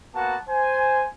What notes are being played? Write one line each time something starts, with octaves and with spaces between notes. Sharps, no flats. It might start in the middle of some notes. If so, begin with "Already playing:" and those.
A#3 B3 F#4 F#5 A5
C5 G#5